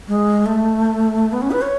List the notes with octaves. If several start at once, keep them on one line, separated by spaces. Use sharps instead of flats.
G#3
A3
B3
C#4
B4
C#5